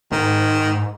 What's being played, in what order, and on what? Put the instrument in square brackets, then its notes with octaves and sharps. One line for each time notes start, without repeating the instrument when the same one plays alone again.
[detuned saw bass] G#2 [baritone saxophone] D#3